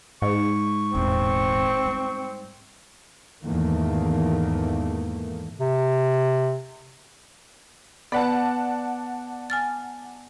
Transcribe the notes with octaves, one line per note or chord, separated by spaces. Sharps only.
G#2 C#6
E1 A1 C4
G3
E2 G#2 D#3 A3 A#3
C3
B3 B4 D5 F#5 A5
G#5 F6 A6